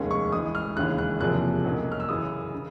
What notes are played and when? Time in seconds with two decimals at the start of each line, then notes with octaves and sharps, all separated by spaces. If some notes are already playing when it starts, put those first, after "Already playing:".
Already playing: F1 D#2 D#3 G#3 C#4
0.11 C#6
0.32 G#1 G#2 E3 D#6
0.55 F6
0.76 E1 D#2 C#3 E3 F#6
0.98 F#6
1.20 F#1 E2 C3 F3 A#3 F#6
1.65 B1 B2 F#3 A#3 C#4
1.92 F6
2.00 E6
2.09 F#2 C#3 E3 D#6
2.54 C#3